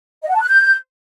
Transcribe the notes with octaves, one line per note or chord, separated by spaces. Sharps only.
D#5
F#5
A5
F#6
G6